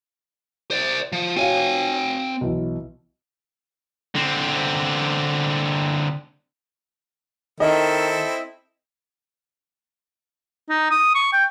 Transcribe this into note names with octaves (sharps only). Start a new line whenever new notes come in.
C5 D5
F3
C4 F#4 C#5 F5 G#5
B1 E3
D3 C4
D#3 C4 E4 A4 D#5
D#4
D#6
C#6
G5